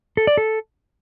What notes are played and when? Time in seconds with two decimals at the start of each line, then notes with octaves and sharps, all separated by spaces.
0.17 A4
0.27 D5
0.37 A4